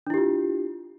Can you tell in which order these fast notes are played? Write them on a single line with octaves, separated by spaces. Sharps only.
D4 E4 G4 F4